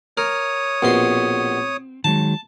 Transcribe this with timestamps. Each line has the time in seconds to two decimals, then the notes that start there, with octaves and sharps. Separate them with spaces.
0.17 A#4 C#5 D#6
0.83 A#1 B2 C4 C6
2.04 D#3 F#3 G#3 A5